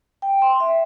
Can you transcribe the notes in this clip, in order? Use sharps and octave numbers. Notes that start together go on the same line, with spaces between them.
G5
C6
E5